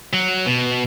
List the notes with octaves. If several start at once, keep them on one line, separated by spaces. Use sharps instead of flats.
F#3
B2